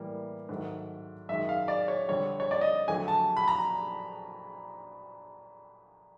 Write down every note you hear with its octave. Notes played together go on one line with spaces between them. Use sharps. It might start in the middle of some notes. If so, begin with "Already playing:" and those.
Already playing: A2 E3 G3 A#3
G#2 D#3 F#3 A3
F#2 D#3 G#3 E5
F5
D5
C#5
F2 D3 G3 C#5
C#5
D5
D#5
F2 D3 F#3 A3 G#5
A5
B5
A#5